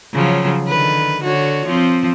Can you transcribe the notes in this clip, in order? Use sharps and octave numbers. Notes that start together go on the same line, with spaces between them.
C#3 F3 F#3
D3 D#3 B4
D3 F#4 C#5
F3 C4